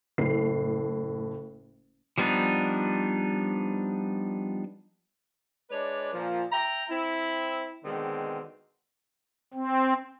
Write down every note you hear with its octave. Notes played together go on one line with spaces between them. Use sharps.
F#1 A2 C7
F3 G3 B3 D4 D#4
G#3 D4 B4 C#5 D5
A#2 F3
E5 G5 A#5
C4 E4
B2 D3 D#3 G#3 C4
C4